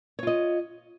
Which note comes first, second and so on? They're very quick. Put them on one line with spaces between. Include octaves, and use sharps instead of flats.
C#5 F4 D#5